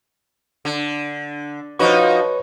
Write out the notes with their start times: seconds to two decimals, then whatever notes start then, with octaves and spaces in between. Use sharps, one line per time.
0.65 D3
1.79 F3 D#4 F#4 B4 C#5 C#6